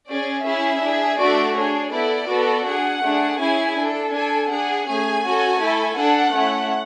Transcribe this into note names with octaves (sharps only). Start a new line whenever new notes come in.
C#4 G#4 D5
C#4 E4 G#4 E5
D4 G#4
A3 D4 F#4 A4 D5
D4 G#4 C#5
B3 E4 A4 D5
B3 F#4 A4
D4 G#4 F#5
A3 D4 G#4
C#4 E4 G#4 G#5
D4 A4
D4 A4 G#5
D4 G#4 F#5
A3 C#4 G#4 G#5
C#4 F#4 A4
A3 E4 A4
D4 A4 F#5
A3 C#4 E4